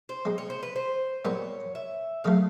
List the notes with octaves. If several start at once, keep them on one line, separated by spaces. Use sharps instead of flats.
C5
B2 G#3 C4
C#5
C5
B4
C5
A#2 G3 B3 C#5
E5
C#3 F#3 A3 F5